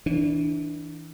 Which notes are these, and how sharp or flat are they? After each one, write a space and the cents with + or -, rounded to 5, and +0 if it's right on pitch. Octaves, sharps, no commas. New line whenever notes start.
E3 -25 D4 +0